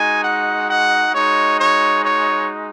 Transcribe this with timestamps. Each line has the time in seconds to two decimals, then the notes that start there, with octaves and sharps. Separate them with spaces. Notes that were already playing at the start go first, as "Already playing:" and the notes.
Already playing: G#3 D#4 F#4 G#5
0.24 F#5
0.69 F#5
1.14 G#3 D#4 F#4 C#5
1.59 C#5
2.03 C#5